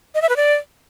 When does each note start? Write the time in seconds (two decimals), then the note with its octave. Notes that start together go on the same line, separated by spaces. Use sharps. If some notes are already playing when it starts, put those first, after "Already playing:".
0.15 D#5
0.22 E5
0.29 B4
0.36 D5